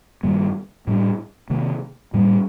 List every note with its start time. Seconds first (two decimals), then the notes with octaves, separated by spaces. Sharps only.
0.23 G2 D#3 G3 A#3
0.87 A2 G3 A#3 D4
1.50 C3 D#3 A#3
2.14 A2 G3 A#3